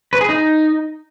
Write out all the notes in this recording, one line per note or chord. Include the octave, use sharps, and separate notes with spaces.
B4
G#4
D#4